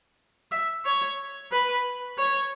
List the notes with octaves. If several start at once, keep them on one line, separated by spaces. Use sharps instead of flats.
E5
C#5
B4
C#5